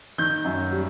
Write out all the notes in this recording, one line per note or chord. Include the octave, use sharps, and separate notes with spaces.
D#3 G6
F#2
G3